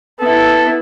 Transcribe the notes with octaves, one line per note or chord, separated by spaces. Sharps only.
B3 E4 A4